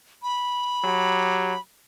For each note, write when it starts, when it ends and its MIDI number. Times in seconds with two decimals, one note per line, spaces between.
0.23 1.60 83
0.83 1.54 54
0.83 1.54 67